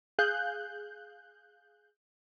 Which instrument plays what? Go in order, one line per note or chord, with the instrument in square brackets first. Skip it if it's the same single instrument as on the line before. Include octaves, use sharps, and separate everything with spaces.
[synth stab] G#4 F5 F#6 G6